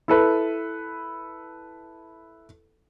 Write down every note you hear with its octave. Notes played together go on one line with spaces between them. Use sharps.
E4 A4 B4